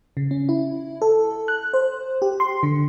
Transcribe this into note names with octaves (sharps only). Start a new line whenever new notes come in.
C#3
C#4
E4
A4
F#6
C5
G4
C6
D3